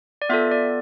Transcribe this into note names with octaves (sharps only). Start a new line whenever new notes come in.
D5
B3 F4 A4 E5
D5